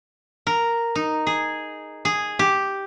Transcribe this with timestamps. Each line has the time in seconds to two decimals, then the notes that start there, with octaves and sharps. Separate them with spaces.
0.47 A#4
0.95 D#4
1.27 G#4
2.05 G#4
2.39 G4